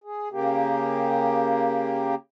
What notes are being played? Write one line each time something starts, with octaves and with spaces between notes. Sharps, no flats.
G#4
C#3 A#3 G4